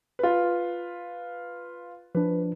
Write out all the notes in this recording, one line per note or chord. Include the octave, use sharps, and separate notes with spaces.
F4 B4
F3 D4 B4